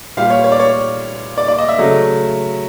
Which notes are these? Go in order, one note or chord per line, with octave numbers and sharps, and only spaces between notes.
A#2 G3 F5
C#5
C#5
D5
C#5
D5
D5
D#5
E5
C#3 F#3 A3